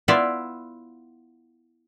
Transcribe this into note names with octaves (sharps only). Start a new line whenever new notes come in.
B3 E4 F4 D5 E5